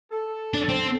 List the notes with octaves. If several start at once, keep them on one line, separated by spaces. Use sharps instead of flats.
A4
D4
C4